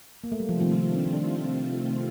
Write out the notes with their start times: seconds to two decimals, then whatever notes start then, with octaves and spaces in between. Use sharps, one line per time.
0.24 A#3
0.32 A3
0.40 G3
0.49 C3 D#3 F3 A3 C4 F4
0.60 F3
0.72 G3
0.96 D4
1.04 C4
1.13 D4